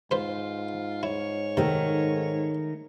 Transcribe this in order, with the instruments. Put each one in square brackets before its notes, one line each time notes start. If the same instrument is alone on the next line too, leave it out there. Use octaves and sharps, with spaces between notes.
[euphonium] G#2 [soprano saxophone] F4 [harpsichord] B4 C5
[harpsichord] E4 [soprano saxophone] C#5
[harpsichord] C3 [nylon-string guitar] D#3 A3